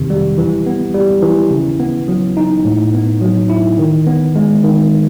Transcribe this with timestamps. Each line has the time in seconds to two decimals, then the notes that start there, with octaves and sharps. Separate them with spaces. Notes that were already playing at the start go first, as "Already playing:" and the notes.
Already playing: F2 C3 D#3
0.10 G3
0.38 E3
0.66 B3
0.95 G3
1.22 E3
1.51 C#3
1.80 B3
2.08 F#3
2.37 D#4
2.65 A2
2.94 B3
3.21 F#3
3.50 E4
3.79 D#3
4.07 B3
4.36 G#3
4.64 D#3